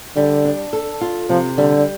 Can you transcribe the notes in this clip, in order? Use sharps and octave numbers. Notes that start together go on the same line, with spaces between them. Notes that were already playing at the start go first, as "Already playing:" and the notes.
D3 G3
D4
A4
F4
C3 F3
D3 G3